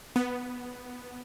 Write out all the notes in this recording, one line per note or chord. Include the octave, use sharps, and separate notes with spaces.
B3